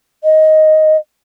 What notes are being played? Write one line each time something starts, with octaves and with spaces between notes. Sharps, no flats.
D#5